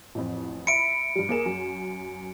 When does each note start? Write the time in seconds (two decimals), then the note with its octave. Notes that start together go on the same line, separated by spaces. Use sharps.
0.15 A1 F2
0.67 E5 B5 C#7 D7
1.16 G2 G3
1.29 A#3 G#4 E7
1.46 F#2